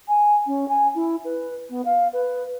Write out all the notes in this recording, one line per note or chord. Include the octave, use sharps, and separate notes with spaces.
G#5
C#4
G#5
E4
B4
B3
F5
B4